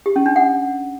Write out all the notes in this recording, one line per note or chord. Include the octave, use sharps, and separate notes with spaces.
G4
C#4
D4
F#5